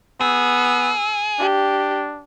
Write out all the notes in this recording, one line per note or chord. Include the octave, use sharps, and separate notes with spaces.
B3 G#4 E6
D4 G4